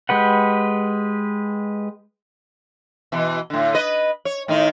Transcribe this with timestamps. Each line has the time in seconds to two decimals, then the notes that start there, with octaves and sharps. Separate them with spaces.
0.09 G#3 G4 B4 F#5
3.12 B2 E3
3.50 A2 D3
3.74 B4 D#5
4.25 C#5
4.48 A2 D#3 D#4